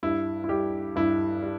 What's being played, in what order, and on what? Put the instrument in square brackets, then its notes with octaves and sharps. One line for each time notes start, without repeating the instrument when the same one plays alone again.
[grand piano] G2 E4
E4
G3 G4
G2 E4
G3